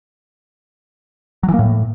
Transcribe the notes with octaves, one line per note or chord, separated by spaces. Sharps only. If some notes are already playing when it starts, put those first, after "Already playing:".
F#3
E3
A#3
A2